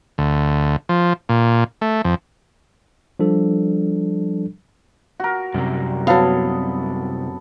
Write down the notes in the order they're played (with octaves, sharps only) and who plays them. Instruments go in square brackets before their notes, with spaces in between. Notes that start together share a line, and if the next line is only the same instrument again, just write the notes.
[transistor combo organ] D2
F3
A#2
A3
F2
[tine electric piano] F3 G3 D4 A4
[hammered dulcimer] F#4 A#4
[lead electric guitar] C2 [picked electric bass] F#2 C3
[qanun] F#3 F5 [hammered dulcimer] B3 A4